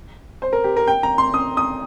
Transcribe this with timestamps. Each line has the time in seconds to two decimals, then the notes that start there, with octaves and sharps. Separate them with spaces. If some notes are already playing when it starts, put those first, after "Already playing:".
0.42 C5
0.53 A#4
0.64 G4
0.76 A#4
0.87 G5
1.03 A#5
1.18 C6
1.34 D#6
1.57 D#6